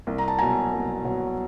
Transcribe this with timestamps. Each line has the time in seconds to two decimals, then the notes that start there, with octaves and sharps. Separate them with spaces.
0.07 C2
0.18 A#5
0.28 A5
0.38 B2 F#3 G#5 A#5
0.73 C2
1.04 B2 F#3